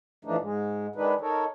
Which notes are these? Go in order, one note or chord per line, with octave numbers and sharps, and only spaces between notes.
A2 E3 F3 A3 D4 D#4
G#2 G#3
D#3 G#3 D4 D#4 B4
D#4 A4 A#4 C#5